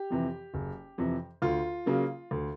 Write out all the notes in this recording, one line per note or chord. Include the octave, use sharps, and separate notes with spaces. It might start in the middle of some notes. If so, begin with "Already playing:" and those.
Already playing: G4
F2 C3 E3
F#1
F2 C3 E3
D2 F4
C#3 F#3 A#3
D2